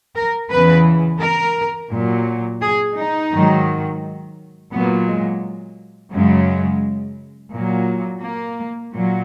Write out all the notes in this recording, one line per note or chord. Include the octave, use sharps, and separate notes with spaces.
A#4
E2 C#3 E3 B4
A#4
A#2 F#3
G#4
D#4
G#2 D#3 F#3
A#2 F#3 B3
G#3
F#2 C#3 F#3 G#3
A#2 F#3
A#3
A#2 F#3